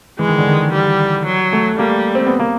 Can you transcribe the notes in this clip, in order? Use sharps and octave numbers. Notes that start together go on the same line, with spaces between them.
E3 G#3
D#3
D3
D#3
G3
F#3
A3
G3 A#3
C4
B3
A#3